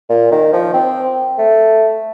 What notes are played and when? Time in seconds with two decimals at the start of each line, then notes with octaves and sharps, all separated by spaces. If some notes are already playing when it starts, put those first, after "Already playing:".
0.10 A#2
0.31 D#3
0.53 F3
0.74 C4
1.38 A3